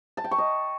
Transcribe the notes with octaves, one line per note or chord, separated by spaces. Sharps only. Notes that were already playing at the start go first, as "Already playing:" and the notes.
A5
G5
C#6
D#5